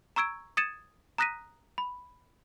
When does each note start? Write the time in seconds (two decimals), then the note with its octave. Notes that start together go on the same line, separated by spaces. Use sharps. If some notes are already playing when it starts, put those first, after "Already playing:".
0.16 A#5 C#6 E6 G#6 D7
0.57 D#6 G#6 A6 C#7 D#7 E7
1.18 A#5 D#6 F#6 A#6 B6 D#7
1.78 B5